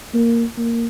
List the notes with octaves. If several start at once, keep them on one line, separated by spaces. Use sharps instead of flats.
A#3
A#3